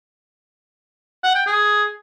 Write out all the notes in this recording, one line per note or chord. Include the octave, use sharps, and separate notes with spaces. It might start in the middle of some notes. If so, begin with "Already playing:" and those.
F#5
G5
G#4